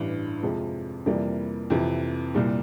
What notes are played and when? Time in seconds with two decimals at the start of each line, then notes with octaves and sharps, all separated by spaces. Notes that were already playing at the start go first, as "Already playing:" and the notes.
Already playing: A1 G2 E3
0.43 F2 C3 F3 G#3
1.06 F2 C3 E3 G3 A#3
1.70 F2 C3 E3
2.35 C2 A#2 G3